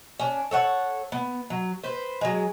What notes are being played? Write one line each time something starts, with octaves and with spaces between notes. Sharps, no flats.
C#4 D4
A4 C#5 F#5
B3
F#3
B4 C5
F#3 G#3